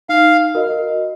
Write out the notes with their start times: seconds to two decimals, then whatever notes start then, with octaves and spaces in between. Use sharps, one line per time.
0.09 D#4 F5
0.55 F#4 A#4 D#5